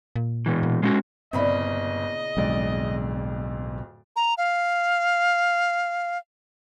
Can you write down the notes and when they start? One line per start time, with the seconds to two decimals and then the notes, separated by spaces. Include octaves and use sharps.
0.16 A#2
0.46 B2 E3
0.63 A#2
0.83 G#3 C#4 F#4
1.33 G1 A#2 C#3 C4 E4 D#5 B5
2.37 D1 B1 F2 D3 G#3 D5
4.16 A#5
4.38 F5